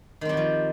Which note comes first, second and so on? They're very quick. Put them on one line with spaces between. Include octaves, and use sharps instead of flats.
D#3 C4 G3 F#4 F3